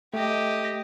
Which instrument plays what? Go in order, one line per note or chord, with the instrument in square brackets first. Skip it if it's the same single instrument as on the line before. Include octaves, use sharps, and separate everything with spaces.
[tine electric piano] A3 [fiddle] G4 D#5